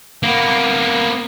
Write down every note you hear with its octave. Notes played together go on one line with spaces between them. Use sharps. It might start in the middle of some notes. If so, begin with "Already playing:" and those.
A#3 B3